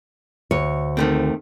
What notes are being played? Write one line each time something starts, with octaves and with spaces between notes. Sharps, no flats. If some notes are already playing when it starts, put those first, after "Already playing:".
D2 C#5
D#3 A3 C4